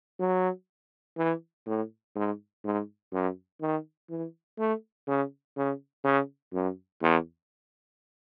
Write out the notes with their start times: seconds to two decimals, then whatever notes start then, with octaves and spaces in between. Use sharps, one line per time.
0.20 F#3
1.17 E3
1.66 A2
2.16 G#2
2.65 G#2
3.13 F#2
3.61 D#3
4.10 E3
4.59 A3
5.07 C#3
5.57 C#3
6.04 C#3
6.53 F#2
7.02 E2